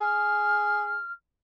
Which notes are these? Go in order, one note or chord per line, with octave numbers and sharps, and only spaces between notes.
G#4 F6